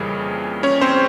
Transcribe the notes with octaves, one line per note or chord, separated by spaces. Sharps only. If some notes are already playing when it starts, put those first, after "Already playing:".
Already playing: F2 C#3 E3 G3 A#3 G#4
C#4 C#5
C4 C5